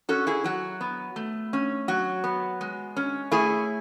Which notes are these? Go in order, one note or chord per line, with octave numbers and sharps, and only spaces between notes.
C#4 F#4 A4
E4 G#4
F#3 F#4
B3
A3
C#4
F#3 F#4
B3
G#3
C#4
A3 E4 G#4